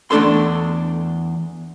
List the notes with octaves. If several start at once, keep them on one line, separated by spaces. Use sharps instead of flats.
E2 A3 D4 A4 C6